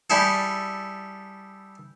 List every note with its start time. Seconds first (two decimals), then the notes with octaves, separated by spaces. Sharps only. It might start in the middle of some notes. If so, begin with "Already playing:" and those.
0.10 G3 E4 G#4 A4